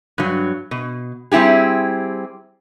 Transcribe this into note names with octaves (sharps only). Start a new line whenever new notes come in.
G2 F#3
B2
G3 C4 E4 G4 G#4